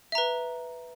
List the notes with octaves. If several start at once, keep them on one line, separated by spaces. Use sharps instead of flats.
B4 E5 A#5